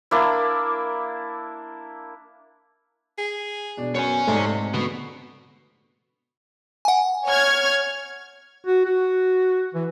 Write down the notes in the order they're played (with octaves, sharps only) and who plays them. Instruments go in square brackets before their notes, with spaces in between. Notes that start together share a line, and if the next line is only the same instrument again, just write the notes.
[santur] A#3 D4 E4
[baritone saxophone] G#4
[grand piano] B2 D4
[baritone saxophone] F#2 [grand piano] B3 [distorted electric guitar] C#5 G#5
[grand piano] G#2 C4 D5 [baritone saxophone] C3 [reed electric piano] A3
[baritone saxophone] D2 [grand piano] B2 D3 [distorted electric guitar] F#4 B4
[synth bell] F#5 G#5
[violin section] C#5 F6 G#6
[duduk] F#4
F#4
E3